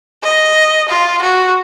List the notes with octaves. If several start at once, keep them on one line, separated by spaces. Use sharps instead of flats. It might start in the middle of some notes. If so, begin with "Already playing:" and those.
D#5
F4
F#4